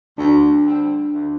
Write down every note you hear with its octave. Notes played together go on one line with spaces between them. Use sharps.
D2 D4
D3 G3 C4
D2